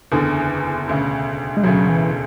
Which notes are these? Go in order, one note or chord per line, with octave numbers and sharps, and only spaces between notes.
F#1 E2 D3
E1 D2 C#3
G#3
E1 D2 C#3 F#3
E3